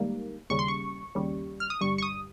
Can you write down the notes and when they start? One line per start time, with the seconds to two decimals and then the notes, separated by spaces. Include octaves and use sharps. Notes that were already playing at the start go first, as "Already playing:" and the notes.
Already playing: G#2 D#3 G3 A#3
0.50 D#2 C#3 G3 C#6
0.59 C6
0.68 C#6
1.15 D#2 C#3 G3
1.60 F6
1.70 D#6
1.81 G1 G2 G3 C#6
1.98 C#6
2.03 D#6